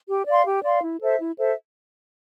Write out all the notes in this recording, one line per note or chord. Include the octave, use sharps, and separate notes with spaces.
G4
D5 F5 C6
G4
D5 F5 C6
E4
A4 C5 E5
E4
A4 C5 E5